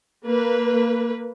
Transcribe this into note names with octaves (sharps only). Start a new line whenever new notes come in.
A#3 B4